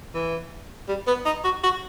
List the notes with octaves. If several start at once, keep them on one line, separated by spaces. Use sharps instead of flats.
E3
G3
B3
D#4
F#4
F#4